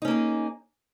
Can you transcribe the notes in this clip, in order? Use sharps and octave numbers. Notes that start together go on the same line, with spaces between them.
A#3 C#4 D#4 G#4